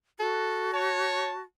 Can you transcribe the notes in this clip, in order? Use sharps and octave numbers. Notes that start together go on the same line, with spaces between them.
F#4 A4
C#5 A5